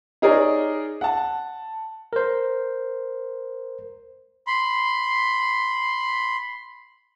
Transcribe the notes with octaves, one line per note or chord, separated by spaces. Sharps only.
D#4 G#4 A#4 C#5 D5
F#5 A5
A#4 C5
B5 C6